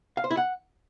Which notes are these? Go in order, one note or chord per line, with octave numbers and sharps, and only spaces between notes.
F5
C5
E4
F#5